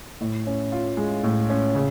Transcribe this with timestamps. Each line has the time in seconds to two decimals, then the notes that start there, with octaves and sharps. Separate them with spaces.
0.21 A2
0.47 C#4
0.72 F4
0.97 G#3
1.23 A2
1.50 C#4
1.75 C#3